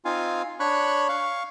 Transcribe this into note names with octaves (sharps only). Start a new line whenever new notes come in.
C4 D#4 F4 F5 G#5
D4 C#5 B5 C#6 F#6
F5 C#6